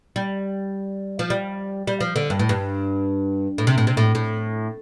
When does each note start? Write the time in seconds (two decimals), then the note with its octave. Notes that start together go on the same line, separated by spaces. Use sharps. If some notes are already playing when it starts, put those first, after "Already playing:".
0.16 G3
1.19 F3
1.30 G3
1.87 G3
2.01 F3
2.16 D3
2.30 G2
2.39 A2
2.49 G2
3.58 A2
3.67 C3
3.78 A2
3.87 C3
3.97 A2
4.15 A2